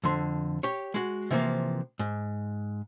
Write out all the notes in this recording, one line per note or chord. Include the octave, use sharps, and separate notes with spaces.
F2 D3 C6
G4 C#5
G#3 F#4
C3 E3 F3 A#3
G#2